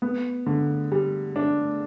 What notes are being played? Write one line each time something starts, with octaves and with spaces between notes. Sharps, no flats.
B3
D3
G3
D4